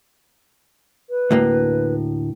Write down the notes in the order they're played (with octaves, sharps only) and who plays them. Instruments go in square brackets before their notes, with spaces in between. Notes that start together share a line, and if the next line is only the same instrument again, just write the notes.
[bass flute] B4
[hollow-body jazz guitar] D2 A2 A#3